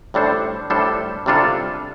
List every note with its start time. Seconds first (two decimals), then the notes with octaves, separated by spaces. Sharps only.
0.14 A2 G3 D4 A4 C5
0.70 A2 G3 D4 A4 C5
1.26 C3 G3 D4 F4 A4